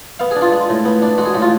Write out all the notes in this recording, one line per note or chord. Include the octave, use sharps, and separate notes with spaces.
B3 F5
D4 G#4
F4
G#3
A2
B3
D4
G#3 F#4
G#4
A2 F#4
F4